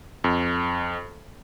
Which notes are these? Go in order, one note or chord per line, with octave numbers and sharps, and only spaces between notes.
F2